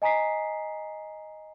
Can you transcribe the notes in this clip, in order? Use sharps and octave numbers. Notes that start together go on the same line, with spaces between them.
D#5 G#5 A#5 D#6 B6 C7